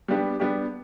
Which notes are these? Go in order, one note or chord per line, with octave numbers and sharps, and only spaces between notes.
G3 B3 D4 G4
G3 B3 D4 G4